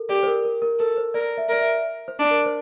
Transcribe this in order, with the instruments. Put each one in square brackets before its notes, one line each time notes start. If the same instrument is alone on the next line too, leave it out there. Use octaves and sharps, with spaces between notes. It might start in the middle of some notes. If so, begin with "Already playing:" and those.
Already playing: [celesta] A4 A#4
[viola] G4 [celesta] D5
[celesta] C5
A#4
A#4
A#4
[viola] A4 [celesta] A#4
[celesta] C5
[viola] A#4 [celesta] D5
[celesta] E5
[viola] A#4 [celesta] D5
[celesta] E5
C5
[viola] D4
[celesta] A#4
C5